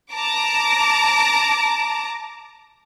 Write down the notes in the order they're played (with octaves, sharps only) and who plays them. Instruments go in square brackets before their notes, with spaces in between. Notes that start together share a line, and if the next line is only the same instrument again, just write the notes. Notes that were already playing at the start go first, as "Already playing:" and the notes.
[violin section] A5 A#5 D6